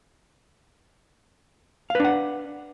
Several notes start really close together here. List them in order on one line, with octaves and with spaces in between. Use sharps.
F5 B4 D4 F#5